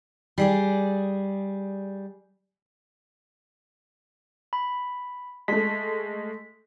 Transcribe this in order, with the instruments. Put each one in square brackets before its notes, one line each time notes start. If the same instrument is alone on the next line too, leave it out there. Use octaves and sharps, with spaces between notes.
[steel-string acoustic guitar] G3 G#4 D5
[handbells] B5
[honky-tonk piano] G#3 A3 [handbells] B6